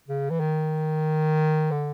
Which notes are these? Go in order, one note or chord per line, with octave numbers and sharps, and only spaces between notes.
C#3
E3
D#3
D3